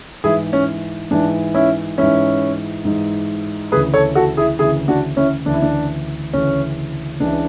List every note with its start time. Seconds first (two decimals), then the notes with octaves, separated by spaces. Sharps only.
0.24 G#2 E3 E4 G#4
0.53 C#4
1.11 G#2 E3 D4
1.54 C#4 E4
1.98 G#2 E3 C#4 E4
2.85 G#2 E3
3.72 D2 C#3 E3 G#4 B4
3.94 A4 C#5
4.15 F#4 A4
4.37 E4 G#4
4.59 D2 C#3 E3 E4 G#4
4.88 D4 F#4
5.17 C#4 E4
5.46 D2 C#3 E3 D4
5.54 E4
5.62 D4
6.33 D2 C#3 E3 C#4
7.20 C#2 C#3 E3 D4